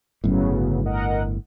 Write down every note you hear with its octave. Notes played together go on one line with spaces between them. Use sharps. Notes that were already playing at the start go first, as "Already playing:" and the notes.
G1 A2 C#3 F#3 B3
A#4 D#5 F#5